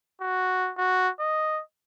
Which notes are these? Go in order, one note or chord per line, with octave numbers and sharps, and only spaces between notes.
F#4
F#4
D#5